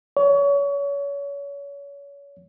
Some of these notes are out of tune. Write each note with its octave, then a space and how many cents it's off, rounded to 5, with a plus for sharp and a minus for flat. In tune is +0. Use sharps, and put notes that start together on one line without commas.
C#5 +30